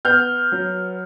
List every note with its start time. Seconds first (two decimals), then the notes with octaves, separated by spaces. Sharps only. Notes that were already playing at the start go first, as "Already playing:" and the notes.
0.05 B3 F6 G6
0.52 F#3